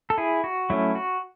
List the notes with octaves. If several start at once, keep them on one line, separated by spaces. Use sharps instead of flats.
A4
E4 G#4
F#4
F#3 A3 C#4 E4
F#4